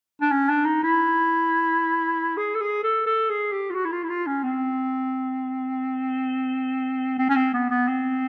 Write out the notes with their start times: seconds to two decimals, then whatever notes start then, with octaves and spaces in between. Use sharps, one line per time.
0.21 D4
0.31 C#4
0.49 D4
0.65 D#4
0.83 E4
2.37 G#4
2.55 A4
2.61 G#4
2.83 A4
3.06 A4
3.29 G#4
3.52 G4
3.70 F4
3.75 F#4
3.85 E4
3.92 F4
4.04 E4
4.09 F4
4.27 C#4
4.43 C4
7.19 C4
7.29 C#4
7.36 C4
7.53 B3
7.70 B3
7.88 C4